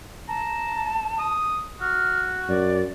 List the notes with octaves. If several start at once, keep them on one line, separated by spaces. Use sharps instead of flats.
A5 A#5
D#6
F#4 F6
F#2 D5